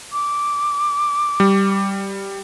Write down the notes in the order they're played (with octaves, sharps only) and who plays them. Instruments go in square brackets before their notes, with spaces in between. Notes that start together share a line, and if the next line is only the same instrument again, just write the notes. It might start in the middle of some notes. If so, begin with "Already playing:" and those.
[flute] D6
[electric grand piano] G3